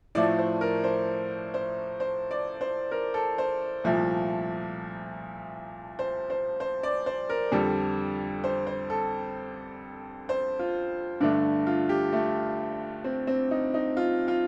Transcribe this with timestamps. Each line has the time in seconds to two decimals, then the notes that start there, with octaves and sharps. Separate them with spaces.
0.15 A2 F3 A3 D5
0.38 C5
0.61 A#4
0.84 C5
1.54 C5
2.00 C5
2.31 D5
2.61 C5
2.91 A#4
3.14 A4
3.38 C5
3.84 C2 A#2 F3 A3
5.99 C5
6.30 C5
6.60 C5
6.83 D5
7.06 C5
7.29 A#4
7.52 F2 D3 G3 A4
8.44 C5
8.67 C5
8.90 A4
10.29 C5
10.59 F4
11.20 G2 D3 A3 D4
11.67 F4
11.89 G4
12.13 A3
13.04 C4
13.27 C4
13.51 D#4
13.74 D#4
13.97 F4
14.28 F4